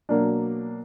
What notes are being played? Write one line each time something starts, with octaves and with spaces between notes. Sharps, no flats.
B2 F#3 A#3 D4